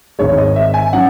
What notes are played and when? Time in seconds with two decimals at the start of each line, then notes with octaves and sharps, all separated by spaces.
0.19 G#1 G#2 D#3 G#3 C#5
0.38 D#5
0.56 E5
0.74 G#5
0.93 F#3 C#4 F#5